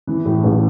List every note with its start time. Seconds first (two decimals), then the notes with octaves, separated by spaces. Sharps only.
0.07 E3
0.25 A2
0.44 A1